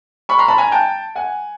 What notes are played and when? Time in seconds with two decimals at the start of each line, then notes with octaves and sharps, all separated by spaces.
0.29 B5 C#6
0.39 A#5 C6
0.48 A5 B5
0.58 G#5 A#5
0.72 G5 A5
1.15 F#5 G#5